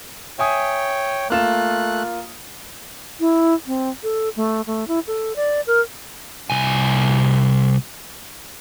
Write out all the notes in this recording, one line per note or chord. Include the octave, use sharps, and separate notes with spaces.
C#5 E5 G5 G#5 D#6
A3 A#3 F4 F#6 E7
E4
C4
A4
A3
A3
E4
A4
D5
A#4
C2 G#5